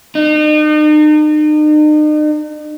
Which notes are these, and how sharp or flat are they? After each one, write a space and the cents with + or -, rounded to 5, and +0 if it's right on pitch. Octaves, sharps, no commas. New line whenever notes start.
D#4 -40